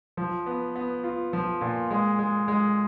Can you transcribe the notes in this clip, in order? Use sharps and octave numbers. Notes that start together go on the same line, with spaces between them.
F3
B3
B3
F4
F3
A#2
G#3
G#3
G#3